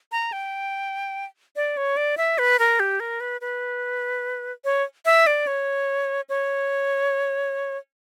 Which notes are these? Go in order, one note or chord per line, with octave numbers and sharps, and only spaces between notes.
A#5
G5
D5
C#5
D5
E5
B4
A#4
G4
A#4
B4
B4
C#5
E5
D5
C#5
C#5